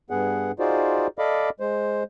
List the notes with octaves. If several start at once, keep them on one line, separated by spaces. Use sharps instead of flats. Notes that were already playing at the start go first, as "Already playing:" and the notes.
G2 B3 G#4 F#5
D#4 F4 F#4 G#4 C5 D5
A4 D5 D#5 F5 B5 D6
G#3 C5